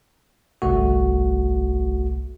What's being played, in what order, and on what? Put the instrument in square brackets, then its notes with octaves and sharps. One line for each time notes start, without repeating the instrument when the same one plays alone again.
[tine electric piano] G1 C2 A3 F#4